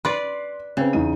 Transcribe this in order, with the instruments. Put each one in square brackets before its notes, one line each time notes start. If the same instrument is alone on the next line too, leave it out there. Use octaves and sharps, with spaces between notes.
[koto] B4 D5 [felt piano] C6
[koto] C#3 [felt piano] C4 B4
[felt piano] E2 D#4 D#7